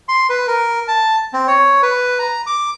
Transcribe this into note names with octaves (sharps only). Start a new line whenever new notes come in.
C6
B4
A#4
A5
C4
C#5
B4
A#5
D6